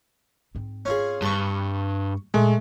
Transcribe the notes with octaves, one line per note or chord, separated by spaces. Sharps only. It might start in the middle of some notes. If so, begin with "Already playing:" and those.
G#2 C4
C#4 F4 G#4
G2 A5 C#6
A#2 G#3 A3